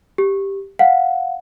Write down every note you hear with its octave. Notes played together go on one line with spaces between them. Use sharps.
G4
F5 F#5